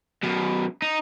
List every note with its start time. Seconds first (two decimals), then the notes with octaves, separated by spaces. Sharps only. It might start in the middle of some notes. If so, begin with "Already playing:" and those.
0.23 F#2 B2
0.82 D#4